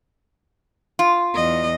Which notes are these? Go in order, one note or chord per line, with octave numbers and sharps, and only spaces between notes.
F4
E2 D#5